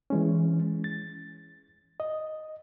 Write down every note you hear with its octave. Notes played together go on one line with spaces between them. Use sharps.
E3 G#3 C#4
A6
D#5